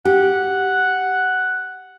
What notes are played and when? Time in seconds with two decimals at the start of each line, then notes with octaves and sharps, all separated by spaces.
0.05 G4 F#5